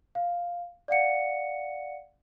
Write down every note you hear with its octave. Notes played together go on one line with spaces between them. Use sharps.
F5
D5 F5 F#5 C#7